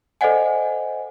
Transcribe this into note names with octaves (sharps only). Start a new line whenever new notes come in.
A4 C5 D5 D#5 F#5 G#5